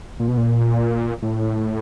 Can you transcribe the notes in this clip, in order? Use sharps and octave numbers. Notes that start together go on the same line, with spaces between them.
A#2
B2
A#2
A2